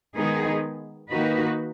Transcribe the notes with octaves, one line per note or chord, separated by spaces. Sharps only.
D#3 G#3 B3 D#4 G#4
D#3 A#3 D#4 F#4 B4